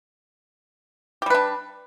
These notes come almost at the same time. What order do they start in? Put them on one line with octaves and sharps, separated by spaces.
G4 G3 B4 D4